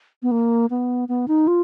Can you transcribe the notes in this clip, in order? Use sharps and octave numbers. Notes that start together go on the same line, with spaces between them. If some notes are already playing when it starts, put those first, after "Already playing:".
B3
A#3
B3
B3
D#4
F4